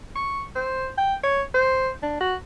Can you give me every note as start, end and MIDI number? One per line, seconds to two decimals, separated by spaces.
0.15 0.43 85
0.56 0.89 72
0.98 1.14 79
1.23 1.42 73
1.54 1.90 72
2.03 2.17 62
2.21 2.35 66